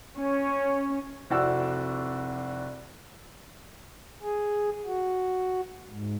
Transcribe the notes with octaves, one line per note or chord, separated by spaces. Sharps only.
C#4
F1 C4 E4 F#4 D5 E6
G#4
F#4
G#2